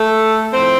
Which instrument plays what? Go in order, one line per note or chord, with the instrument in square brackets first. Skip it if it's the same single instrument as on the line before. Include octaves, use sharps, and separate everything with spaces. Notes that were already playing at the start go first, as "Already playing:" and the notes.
Already playing: [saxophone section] A3 A4
A2 F3 C4 C5